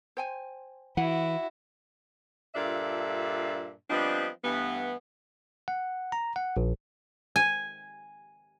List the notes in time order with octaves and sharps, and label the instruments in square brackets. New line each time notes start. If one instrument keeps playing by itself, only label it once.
[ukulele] C5 G5 G#5
[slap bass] E3 [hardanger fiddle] E4 F#4 [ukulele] F#5
[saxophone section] G2 A#2 D4 F4 A4 E5
F3 G3 B3 C4 D4 D#5
G2 E3 A3 B3
[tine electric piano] F#5
A#5
F#5
A#1
[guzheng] G#5